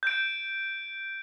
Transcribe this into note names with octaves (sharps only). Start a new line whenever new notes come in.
G6 D7